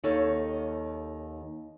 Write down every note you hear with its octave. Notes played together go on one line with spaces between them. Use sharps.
D#2 D#4 A4 C#5 F5